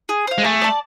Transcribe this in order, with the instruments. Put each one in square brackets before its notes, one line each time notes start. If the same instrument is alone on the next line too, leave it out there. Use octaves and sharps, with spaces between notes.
[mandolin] G#4
C5 F5
[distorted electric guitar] G#3
[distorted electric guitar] A3 [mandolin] G#4
[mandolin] D5 A5